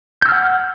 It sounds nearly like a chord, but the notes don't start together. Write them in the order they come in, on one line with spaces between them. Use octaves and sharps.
G6 E6 F6 F#5